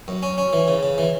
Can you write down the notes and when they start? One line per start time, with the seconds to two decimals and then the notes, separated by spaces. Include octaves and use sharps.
0.08 F#2
0.23 C#4
0.38 C#4
0.53 E3
0.68 C#3
0.83 C#3
0.98 E3